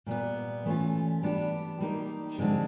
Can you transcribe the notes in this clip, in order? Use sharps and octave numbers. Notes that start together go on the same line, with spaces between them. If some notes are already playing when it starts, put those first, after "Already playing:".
A#2 G3 B3
E3 A3 C#4 F4
G3 B3 D4 G4
G3 A#3 D#4 G4
D3 F3 G#3 C4